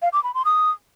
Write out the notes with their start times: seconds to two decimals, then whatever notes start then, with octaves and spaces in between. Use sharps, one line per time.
0.02 F5
0.13 D6
0.24 B5
0.34 C6
0.45 D#6